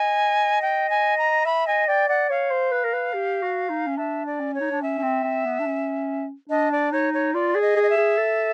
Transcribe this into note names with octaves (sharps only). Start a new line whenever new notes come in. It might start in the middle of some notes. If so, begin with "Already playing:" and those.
Already playing: D#5 G#5
G5
G#5
A#5
E5 B5
D#5 G#5
D5 G5
D5 F#5
C#5 F5
C5
B4
A#4
B4
G4
F#4
D#4
C#4
D4 E5
D5
C#4
C#5
D#4
D4
C#4 E5
C#4
C4
C4
B3
D4
C#4
D4 D#5
D5
D#4 C#5
C#5
F4 D5
G#4
D#5
G#4
D#5
E5
G#4
A4